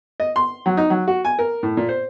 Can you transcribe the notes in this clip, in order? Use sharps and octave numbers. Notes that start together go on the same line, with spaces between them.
D#5
C6
F#3
D#4
F#3
F#4
G#5
A#4
A2
A#2
C5